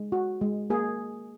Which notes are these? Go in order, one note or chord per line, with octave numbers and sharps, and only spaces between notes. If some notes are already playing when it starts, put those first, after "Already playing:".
Already playing: G#3
F#4
G#3
A#3 G#4